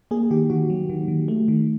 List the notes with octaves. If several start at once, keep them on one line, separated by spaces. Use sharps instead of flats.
A#3 G#4
D#3 G4
D#3 F#4
F#3
D#3
D#3
A3
D#3